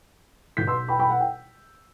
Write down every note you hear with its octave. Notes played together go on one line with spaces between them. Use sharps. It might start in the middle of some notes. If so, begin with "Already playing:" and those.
B1 B2 G6 B6
C6 E6
G5 B5
G5 B5
F#5
G5